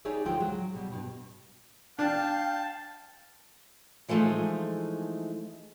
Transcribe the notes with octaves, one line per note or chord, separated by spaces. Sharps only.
D#4 G4 G#4 C#5 D5 E5
D2 D3 F3 G#3 F4 G5
F#3
B2 G3
G2 B2
D4 F5 G5 A5
E3 F3 G#3 A3 D#4